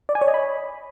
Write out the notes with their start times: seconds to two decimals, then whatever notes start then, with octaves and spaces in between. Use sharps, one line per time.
0.09 D5
0.15 G#5
0.21 C#5
0.28 D#5
0.34 B5